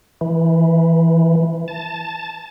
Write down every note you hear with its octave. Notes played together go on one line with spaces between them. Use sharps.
E3
A5